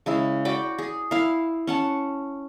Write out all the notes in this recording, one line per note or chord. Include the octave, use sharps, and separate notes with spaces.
C#3 G#3 E4
F#4 D5 G5 B5
G#4
E4 F5
C#4 F#5 A5